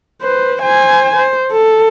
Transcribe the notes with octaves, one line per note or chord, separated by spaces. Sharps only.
B4 C5
C5 G#5
C5
A4